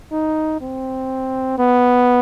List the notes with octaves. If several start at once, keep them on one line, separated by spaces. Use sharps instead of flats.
D#4
C4
B3